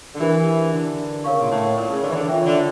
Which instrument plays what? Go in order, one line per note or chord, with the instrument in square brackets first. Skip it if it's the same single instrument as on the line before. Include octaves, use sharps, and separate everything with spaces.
[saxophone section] D3
[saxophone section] E3 [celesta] D4 G4 A#4
[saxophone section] D3
[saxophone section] C#3 [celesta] A#4 C#5 F5 C#6
[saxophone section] A#2
A2
A#2
C#3
D3
E3
D3
[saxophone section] E3 [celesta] F4 C#5 E5 G5
[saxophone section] C#3
D3